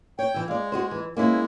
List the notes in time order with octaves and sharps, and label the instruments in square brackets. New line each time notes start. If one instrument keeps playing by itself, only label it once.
[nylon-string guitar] C#5 [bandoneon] G5
[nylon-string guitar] E3 E4
[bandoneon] G#3 [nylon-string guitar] D5 F5
[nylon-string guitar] F#4 G#4 C5
E3
[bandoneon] G#3 [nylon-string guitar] A#3 C#4 E4